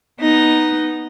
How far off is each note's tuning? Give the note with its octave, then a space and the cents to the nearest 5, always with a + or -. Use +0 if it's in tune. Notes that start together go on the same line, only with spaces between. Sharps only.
B3 +0 D#4 +0